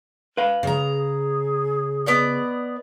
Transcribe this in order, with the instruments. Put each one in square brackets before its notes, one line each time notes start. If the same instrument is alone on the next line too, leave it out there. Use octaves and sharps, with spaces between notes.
[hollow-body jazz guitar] B4 F5
[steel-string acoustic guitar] C#3 A#5 [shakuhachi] G#4
[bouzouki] B3 D5 D#5